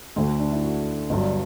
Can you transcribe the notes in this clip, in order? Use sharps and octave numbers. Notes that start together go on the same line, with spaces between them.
D2 D3 A3 D4
D4
E4
F#4
G1 G2 F#3